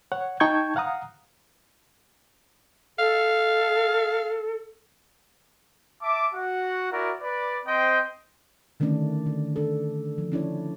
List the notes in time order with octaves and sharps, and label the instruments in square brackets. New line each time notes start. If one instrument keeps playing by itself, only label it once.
[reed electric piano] C#5 F#5
D#4 G5 A5 C#6 G6 G#6
F5 F#5 A#5 D#6
[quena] A4 [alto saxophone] F5
[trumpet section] E5 A5 D6
F#4 F#5
E4 F#4 A#4 D5
B4 D5
C4 C5 D#5 G5
[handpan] D3 D#3 A3 C#4 D4
D3
D4 A4
F3
C#4 D4 E4 C#5